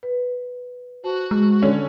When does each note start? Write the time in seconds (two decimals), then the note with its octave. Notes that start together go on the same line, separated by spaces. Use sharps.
0.03 B4
1.04 F#4 C5 A5
1.31 G#3
1.62 D3 C#4